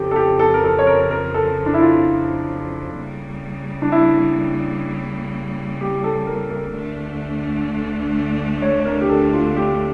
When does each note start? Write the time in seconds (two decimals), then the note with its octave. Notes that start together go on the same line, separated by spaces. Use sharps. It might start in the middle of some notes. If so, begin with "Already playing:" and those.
Already playing: F2 C#3 F3 G4 A4
0.11 A4
0.16 G4
0.39 A4
0.54 A#4
0.64 A4
0.78 C#5
0.87 A#4
1.11 A#4
1.34 A4
1.66 D4
1.74 E4
1.81 F4
2.98 C#3 G3 A#3
3.82 D4
3.92 E4
5.81 G4
6.04 A4
6.27 A#4
6.51 A#4
6.74 D2 D3 A3 D4
8.62 C#5
8.80 C#5
8.85 A#4
9.01 G4
9.09 A4
9.33 F4
9.56 G4